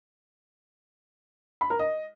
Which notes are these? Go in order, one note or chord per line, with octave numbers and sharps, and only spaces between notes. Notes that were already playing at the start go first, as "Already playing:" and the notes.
B5
A#4
D#5